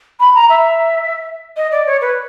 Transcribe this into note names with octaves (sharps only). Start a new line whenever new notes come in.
B5
A#5
E5
D#5
D5
C#5
B4